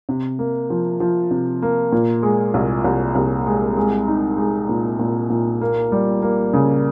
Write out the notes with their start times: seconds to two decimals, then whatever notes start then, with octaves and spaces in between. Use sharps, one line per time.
0.09 C3
0.39 A#3
0.70 F3
1.00 F3
1.31 C3
1.62 A#3
1.92 A#2
2.23 G#3
2.54 C2
2.84 C2
3.15 C2
3.46 G#3
3.77 G#3
4.08 D#4
4.38 G#3
4.69 A#2
4.99 A#2
5.30 A#2
5.61 A#3
5.92 G3
6.22 A#3
6.54 C#3